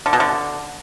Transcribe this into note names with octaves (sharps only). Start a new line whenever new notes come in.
D3
B2
D3